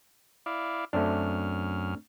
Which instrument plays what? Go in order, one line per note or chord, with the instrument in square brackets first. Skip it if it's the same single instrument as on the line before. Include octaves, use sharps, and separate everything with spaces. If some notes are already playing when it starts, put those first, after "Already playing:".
[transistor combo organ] E4 D5 F5
[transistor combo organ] F#2 F6 [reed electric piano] A3 C4 D4